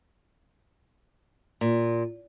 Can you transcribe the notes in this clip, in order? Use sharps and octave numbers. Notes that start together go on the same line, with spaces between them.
A#2